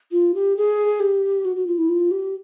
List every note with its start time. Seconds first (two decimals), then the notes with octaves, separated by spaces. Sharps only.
0.12 F4
0.34 G4
0.57 G#4
1.00 G4
1.45 F#4
1.56 F#4
1.67 F4
1.78 E4
1.89 F4
2.11 G4